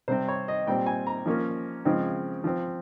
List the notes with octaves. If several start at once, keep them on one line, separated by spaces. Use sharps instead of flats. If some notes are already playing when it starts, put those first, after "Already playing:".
C3 G3 C4 C5
C#5
D#5
A#2 G3 C4 G5
G#5
A#5
F3 A#3 C#4
C#3 F3 G#3 C4
F3 C4